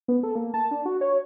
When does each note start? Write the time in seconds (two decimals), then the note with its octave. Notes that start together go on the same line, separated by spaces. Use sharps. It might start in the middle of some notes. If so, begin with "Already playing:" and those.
0.08 B3
0.23 A4
0.36 A#3
0.54 A5
0.71 D4
0.85 F#4
1.01 C#5